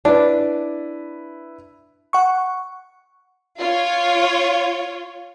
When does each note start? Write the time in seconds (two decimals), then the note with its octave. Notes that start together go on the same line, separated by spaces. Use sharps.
0.05 D4 E4 B4
2.13 F#5 C#6
3.58 F4 C#5